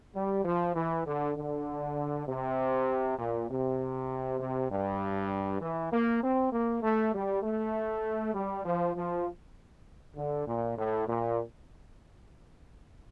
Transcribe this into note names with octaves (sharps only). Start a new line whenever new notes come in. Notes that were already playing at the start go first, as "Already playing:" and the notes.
G3
F3
E3
D3
D3
C3
A#2
C3
C3
G2
E3
A#3
C4
A#3
A3
G3
A3
G3
F3
F3
D3
A#2
A2
A#2